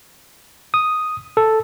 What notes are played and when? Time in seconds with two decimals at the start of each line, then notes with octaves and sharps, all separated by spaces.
0.74 D#6
1.37 A4